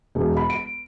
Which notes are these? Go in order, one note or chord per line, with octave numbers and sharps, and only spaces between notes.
E1
B5
D7